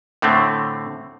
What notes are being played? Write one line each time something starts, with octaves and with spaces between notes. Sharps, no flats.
A2 D3 A3 C4